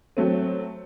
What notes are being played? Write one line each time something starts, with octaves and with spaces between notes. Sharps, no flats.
F#3 A3 C4